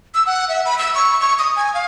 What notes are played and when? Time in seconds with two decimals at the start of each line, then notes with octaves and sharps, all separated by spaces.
0.14 E6
0.27 F#5
0.49 E5
0.65 B5
0.78 E6
0.95 C#6
1.20 C#6
1.39 D#6
1.56 G#5
1.74 F5